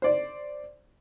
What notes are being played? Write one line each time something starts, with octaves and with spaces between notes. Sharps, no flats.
C5 D5